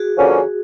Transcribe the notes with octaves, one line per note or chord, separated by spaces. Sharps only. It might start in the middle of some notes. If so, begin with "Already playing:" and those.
Already playing: F#4 G#4
D3 F3 A#3 C#4